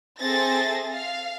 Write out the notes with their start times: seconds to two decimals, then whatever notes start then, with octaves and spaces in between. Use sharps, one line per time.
0.20 C4 G#4 A4 E5 A6 A#6
0.93 F5